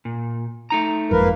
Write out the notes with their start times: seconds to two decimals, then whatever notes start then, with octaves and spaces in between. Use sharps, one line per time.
0.05 A#2
0.70 A3 D#4 A#5
1.11 F#1 F2 G#2 A#3 A#4 B4